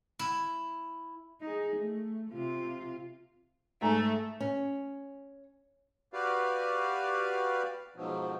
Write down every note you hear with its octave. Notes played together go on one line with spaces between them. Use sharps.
E4
D#4 G#4
A3
C3 F4
G#2 A3 G#5 A#5
C#4
F#4 G4 B4 D5 F5
F2 G#2 B2 D#3 F3 F#3